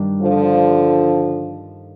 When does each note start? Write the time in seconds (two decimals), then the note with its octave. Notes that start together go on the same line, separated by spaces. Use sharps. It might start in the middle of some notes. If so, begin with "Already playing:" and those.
Already playing: G2 D#3 G3 D4 G4
0.22 D3 F3